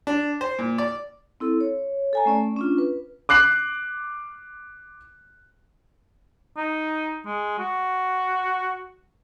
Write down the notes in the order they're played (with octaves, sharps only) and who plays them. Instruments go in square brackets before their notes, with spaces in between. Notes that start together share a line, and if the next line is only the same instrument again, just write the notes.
[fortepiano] D4
C5
A#2
D5
[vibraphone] C4 E4 A4
C#5
A4 G#5 A#5
A3 C#4 D5
C#4 D4 F4
B4
[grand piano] D6 F#6 C7 F#7
[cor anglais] D#4
G#3
F#4